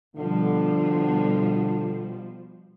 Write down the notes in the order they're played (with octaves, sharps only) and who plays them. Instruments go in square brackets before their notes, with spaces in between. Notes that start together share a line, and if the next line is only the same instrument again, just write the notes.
[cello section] B2 F3 G3 [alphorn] D3